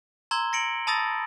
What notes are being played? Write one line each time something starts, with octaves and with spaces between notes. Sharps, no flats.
A#5 C6 E6 G#6 G7
A#6 C#7 D7 F#7
A5 B5 D#6 E6 A6 A#6